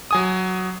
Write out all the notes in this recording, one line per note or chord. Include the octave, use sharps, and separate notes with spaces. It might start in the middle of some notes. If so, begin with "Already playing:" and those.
F#3 G#5 D#6